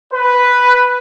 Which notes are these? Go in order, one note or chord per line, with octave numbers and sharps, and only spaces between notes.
B4